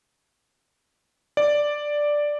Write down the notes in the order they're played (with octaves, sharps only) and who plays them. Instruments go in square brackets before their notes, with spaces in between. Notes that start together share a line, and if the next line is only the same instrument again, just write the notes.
[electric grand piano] D5